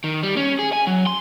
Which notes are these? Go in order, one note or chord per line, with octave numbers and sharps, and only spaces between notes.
D#3
G3
C#4
G#4
G#5
F#3
C6